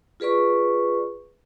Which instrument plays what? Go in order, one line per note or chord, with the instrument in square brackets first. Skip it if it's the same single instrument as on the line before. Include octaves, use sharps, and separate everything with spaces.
[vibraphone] F4 G#4 B4 D5 C#6